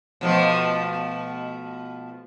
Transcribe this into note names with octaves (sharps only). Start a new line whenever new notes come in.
B2 F3 A3